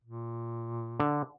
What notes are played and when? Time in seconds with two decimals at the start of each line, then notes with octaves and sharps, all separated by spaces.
0.04 A#2
1.00 D3